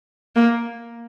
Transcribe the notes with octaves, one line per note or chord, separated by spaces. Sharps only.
A#3